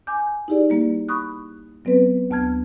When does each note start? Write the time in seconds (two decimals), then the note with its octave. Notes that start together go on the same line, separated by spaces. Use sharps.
0.07 G#5 D6 G6
0.48 D#4 E4 G4 G#4 D5
0.70 G3 A#3
1.09 B5 C#6 D#6 F#6
1.85 F#3 B3 C4 B4
2.30 D2 B3 A5 F6 G#6